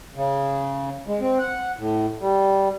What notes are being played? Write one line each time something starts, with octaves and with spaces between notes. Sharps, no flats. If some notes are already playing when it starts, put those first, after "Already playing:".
C#3
G#3
C4
F#5
A2
G3